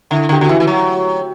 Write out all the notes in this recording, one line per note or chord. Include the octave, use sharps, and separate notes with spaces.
D3 E4
D3
G4
D3 F#4
E3 E4
E3
F#3